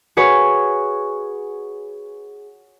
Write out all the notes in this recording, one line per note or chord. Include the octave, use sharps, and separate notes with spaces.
F#4 G#4 B4 C#5